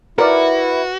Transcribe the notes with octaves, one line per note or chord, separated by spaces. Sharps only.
E4 F#4 A#4 B4 D5